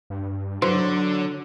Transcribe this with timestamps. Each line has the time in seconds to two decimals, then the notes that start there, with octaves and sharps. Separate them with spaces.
0.10 G2
0.62 D3 F#3 D4 E4 B4 C5